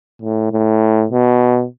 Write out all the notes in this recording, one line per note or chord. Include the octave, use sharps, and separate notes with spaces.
A2
A2
B2